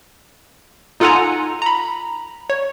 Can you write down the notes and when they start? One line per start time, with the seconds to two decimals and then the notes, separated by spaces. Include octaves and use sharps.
1.00 D#4 F4 A4 F#5 G#5 A#5
1.62 A#5 B5
2.50 C#5